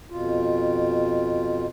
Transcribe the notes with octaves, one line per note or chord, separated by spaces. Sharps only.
F2 B2 F4